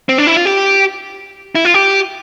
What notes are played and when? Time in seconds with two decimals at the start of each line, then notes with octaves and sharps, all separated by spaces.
0.09 C4
0.18 D4
0.27 E4
0.37 F4
0.45 G4
1.55 E4
1.65 F4
1.74 G4